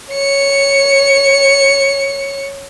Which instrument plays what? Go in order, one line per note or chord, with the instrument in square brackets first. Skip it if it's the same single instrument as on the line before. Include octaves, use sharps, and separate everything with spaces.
[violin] C#5 C#7